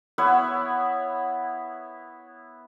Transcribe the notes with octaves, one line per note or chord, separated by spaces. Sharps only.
B3 E4 B4 C#5